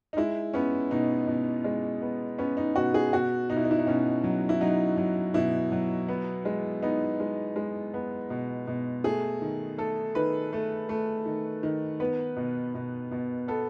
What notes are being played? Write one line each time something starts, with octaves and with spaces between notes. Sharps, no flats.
D#4
G#3 E4
B3 C#4
B2 D#4
B2
G#3
B3
B3 C#4
D#4
B2 F#4
G#4
B2 F#4
B2 D#4
E4
D#4
E4
D#4
B2 C#4
F#3
E4
F#3 D#4
F#3
B2 E4
F#3
B3
G#3
B3 D#4
G#3
G#3
B3
B2
B2
A3 G#4
D#3
A3 A4
D#3 B4
A3
A3
D#3
D#3
B3 B4
B2
B2
B2
B3 A4